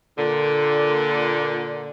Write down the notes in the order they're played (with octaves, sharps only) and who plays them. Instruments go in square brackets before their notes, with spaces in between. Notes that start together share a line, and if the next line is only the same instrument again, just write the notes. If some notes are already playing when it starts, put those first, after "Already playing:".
[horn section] A#2 D3